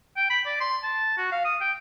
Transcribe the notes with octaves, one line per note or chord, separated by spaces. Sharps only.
G5
B5
D5
C6
A5
F#4
F5
D#6
G5